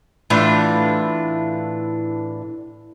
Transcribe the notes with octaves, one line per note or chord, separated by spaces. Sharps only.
A2 E3 D4 F4